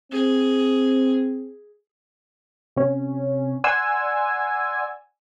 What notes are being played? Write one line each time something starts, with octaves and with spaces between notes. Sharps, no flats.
C4 G#4
C3 C#4
D5 F#5 G#5 C6 E6